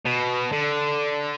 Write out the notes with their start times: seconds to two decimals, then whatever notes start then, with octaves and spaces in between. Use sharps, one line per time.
0.06 B2
0.53 D3